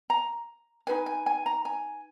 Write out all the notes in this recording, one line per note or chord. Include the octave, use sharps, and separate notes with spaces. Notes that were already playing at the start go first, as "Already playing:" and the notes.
A#5
D#4 G#4 B4 G#5
G#5
G#5
A#5
G#5